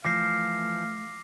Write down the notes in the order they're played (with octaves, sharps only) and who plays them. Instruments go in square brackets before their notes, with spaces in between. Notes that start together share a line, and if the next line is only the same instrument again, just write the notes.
[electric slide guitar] E3 F3 [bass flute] A3 [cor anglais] F5 [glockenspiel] D6 A#6 C7